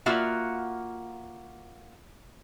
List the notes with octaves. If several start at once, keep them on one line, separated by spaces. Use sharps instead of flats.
A#3 F4 F#4 E5 F#5 A#5